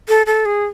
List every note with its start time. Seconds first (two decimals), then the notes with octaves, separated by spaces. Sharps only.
0.08 A4
0.26 A4
0.45 G#4